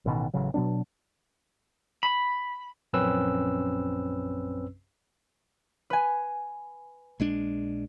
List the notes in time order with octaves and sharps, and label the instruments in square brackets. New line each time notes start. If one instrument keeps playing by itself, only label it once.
[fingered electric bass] A1 B2 D#3
A1 C#3 F#3
B2 F#3 B3 D4
[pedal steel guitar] B5
[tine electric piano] A#1 F#2 C4 C#4 B4 E6
[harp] B4 G#5
[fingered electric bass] A#1 G#3 D4